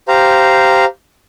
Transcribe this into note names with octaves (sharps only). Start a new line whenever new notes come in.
G4 C5 F5 A#5